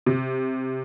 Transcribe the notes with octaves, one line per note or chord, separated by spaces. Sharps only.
C3